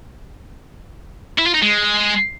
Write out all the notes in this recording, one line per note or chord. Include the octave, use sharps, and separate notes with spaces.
E4
F4
D#4
G#3